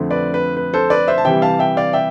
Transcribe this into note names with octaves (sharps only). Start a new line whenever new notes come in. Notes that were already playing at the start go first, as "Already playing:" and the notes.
Already playing: F2 D3 A3 C4
B4 D5
B4
B4
A4 C5
B4 D5
C5 E5
A5
C3 E3 G3 E5 G5
F5 A5
E5 G5
D5 F5
E5 G5